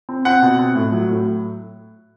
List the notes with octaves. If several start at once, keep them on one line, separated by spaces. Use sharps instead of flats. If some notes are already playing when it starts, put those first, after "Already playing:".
C4
C4 F#5
B2
C4
A2
F#3
A2